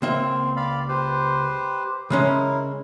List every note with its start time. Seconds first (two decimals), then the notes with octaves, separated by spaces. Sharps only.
0.02 C#2 A#3 C4 E5
0.56 D5 F5 B5
0.89 G4 B4 C5
2.10 C#3 G#3 C#4 E4 A#4